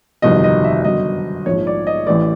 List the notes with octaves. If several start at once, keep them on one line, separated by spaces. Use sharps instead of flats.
G1 F2 C3 D#3 F#3 D#5
D#5
E5
G1 F#2 D3 F#3 D#5
A#1 G#2 F3 C#5
D5
D#5
A1 A2 E3 D5